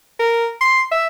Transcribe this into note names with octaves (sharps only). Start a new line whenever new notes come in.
A#4
C6
E5